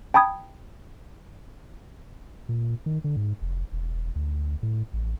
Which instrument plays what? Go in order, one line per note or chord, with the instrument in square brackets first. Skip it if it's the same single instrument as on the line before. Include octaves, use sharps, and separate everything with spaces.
[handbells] G5 A5 B5 D#6 G#6
[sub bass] A#2
D#3
D3
G#2
F1
E1
D2
A2
A1